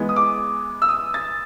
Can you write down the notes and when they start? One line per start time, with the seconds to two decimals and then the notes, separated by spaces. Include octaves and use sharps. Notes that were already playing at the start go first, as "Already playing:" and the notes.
Already playing: E3 G#3 B3
0.09 D#6
0.16 D6
0.82 E6
0.89 D#6
1.14 A6